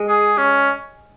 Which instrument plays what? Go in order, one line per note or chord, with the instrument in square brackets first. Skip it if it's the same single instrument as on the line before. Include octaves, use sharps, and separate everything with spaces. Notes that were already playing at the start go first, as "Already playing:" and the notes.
Already playing: [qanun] G#3
[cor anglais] G#4
C#4